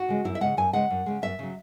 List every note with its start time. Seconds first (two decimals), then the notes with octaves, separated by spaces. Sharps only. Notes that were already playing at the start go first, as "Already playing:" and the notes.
Already playing: F#4
0.08 C#3 G#3
0.24 F#2 E4
0.35 E5
0.41 C#3 G#3 F#5
0.57 F#2 G#5
0.73 C#3 G#3 F#5
0.91 F#2
1.06 C#3 G#3
1.22 F#2 E5
1.39 C#3 F#3